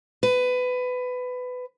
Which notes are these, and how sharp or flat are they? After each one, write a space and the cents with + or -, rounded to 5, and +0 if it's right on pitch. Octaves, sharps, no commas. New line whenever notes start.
B4 +20